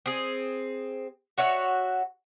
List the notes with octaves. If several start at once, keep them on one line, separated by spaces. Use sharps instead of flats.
C4 G#4
F#4 C#5 E5 F#5